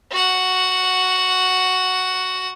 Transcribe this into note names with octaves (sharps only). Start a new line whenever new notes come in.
F#4 F#5